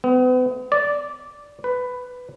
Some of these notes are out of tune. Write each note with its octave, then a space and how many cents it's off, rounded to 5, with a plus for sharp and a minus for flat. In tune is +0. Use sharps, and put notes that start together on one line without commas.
B3 +40
D5 -10
B4 +10